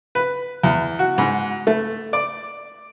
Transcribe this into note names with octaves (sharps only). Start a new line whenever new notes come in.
B4
E2
F#4
G#2
A3
D5